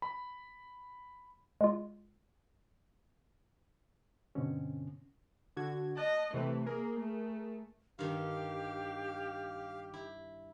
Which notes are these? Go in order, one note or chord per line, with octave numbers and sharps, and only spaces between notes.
B5
G#3 F4
G2 B2 D3 C4 C#4
D3 F#4 G#6
D#5 A5 F#6
C3 E3 A3 B4
A#3 G#4 A#4
A3
G2 D#3 G4 F5
E4